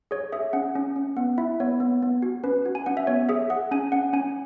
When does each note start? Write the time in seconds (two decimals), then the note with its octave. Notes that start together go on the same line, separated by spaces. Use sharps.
0.11 G#4 C#5
0.32 G#4 E5
0.53 C#4 F#5
0.75 C#4
0.96 C#4
1.17 B3 F#5
1.38 E4 E5
1.60 B3 C#5
1.80 B3
2.02 B3
2.22 F#4
2.44 C#4 B4
2.65 F#4
2.75 G#5
2.86 C#4 F#5
2.97 E5
3.07 B3 C#5
3.29 G#4 E5
3.50 G#4 F#5
3.71 C#4 G#5
3.92 C#4 F#5
4.13 C#4 G#5